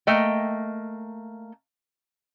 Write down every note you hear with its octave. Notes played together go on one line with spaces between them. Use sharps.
A3 A#3 D#5 G5